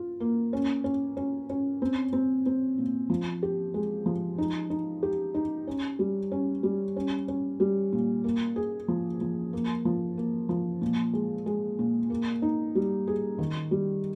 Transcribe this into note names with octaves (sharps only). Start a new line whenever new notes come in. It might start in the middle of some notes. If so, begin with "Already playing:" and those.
Already playing: F4
A#3
C#4
C#4
C#4
C#4
C4
C4
C4
A#2
F3
G4
G#3
F3
D#4
D#4
G4
D#4
C#4
G3
C#4
G3
C#4
C#4
G3
A#2
A#3
G#4
F3
F3
A#3
F3
A#3
F3
A#2
G#3
G#3
A#2
A#3
D#4
G3
G#4
D#3
G3